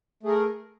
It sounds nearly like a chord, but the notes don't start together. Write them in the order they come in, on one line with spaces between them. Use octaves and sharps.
A3 G#4 A#4